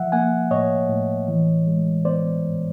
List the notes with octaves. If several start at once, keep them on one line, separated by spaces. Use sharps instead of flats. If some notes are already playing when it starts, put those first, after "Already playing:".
Already playing: F3 E5 F#5
A#3 F#5 G#5
A2 C#5 D#5
A2
E3
G#3
B3 C5 D5
G#2